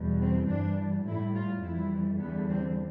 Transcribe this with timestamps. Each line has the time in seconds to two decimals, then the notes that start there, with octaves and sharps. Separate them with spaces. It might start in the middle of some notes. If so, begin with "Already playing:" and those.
Already playing: E2 B2 G3
0.21 C4
0.49 G2 E3 G3 D4
1.06 A2 G3 E4
1.34 F4
1.63 F2 E3 G3 E4
2.20 E2 D3 G3 B3
2.49 C4